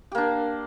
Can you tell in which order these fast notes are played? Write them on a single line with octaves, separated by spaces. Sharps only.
G4 A#3 D4